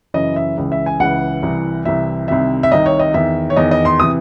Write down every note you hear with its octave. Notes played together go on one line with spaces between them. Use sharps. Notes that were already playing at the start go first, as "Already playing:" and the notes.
F#2 C#3 E3 D#5
E5
C#2 C#3 E3
E5
G#5
C#2 C#3 E3 F#5
C2 C3 E3
C2 C3 E3 E5
C2 C3 D#3 E5
E5
C2 C3 D#3 D#5
C#5
D#5
E2 D#3 E5
C#5
E2 D#3 D#5
D#5
C6
C3 E3 D#6